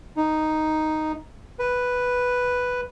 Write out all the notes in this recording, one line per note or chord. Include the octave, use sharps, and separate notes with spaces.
D#4
B4